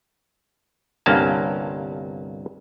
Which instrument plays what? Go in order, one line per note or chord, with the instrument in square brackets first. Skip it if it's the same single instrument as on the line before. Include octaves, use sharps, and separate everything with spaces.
[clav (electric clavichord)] G1 C2 G2 A#3 C#4 A5